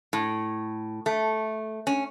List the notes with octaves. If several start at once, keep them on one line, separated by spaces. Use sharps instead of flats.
A2
A3
C#4